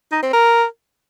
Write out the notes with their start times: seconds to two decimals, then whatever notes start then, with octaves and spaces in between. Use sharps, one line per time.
0.12 D#4
0.23 C4
0.33 A#4